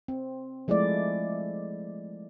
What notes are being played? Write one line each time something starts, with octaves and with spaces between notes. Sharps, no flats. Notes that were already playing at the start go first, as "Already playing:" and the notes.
C4
F3 G#3 A3 E4 D5